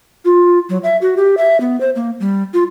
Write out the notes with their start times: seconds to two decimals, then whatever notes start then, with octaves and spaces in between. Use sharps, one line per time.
0.25 F4
0.69 F#3
0.83 E5
1.02 F#4
1.17 G4
1.37 E5
1.60 B3
1.81 C5
1.96 A#3
2.20 G3
2.54 F4